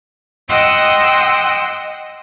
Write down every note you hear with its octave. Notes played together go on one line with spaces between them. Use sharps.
D#5 F#5 G5 C6 D#6 E6